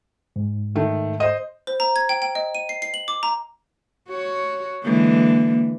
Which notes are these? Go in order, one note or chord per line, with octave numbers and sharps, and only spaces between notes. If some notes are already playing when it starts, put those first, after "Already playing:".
G#2
D#3 A3
C5 D#5
C5
A#5
G#6
G5
G5
D#5
D#7
C7
C7
F#7
D6
A#5
F#4 C#5
D3 E3 G#3 A#3